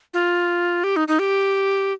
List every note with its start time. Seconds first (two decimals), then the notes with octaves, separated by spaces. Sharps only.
0.14 F4
0.84 G4
0.96 D#4
1.08 D#4
1.19 G4